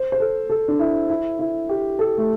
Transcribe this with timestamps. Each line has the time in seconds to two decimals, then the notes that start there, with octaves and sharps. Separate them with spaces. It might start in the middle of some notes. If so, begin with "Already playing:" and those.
Already playing: C5
0.12 C5
0.20 A4
0.50 A4
0.68 D4
0.79 E4
1.09 E4
1.39 E4
1.69 G4
1.99 A4
2.18 A3